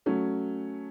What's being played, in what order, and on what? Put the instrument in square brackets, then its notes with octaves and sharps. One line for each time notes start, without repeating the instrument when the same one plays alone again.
[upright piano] F#3 A3 C#4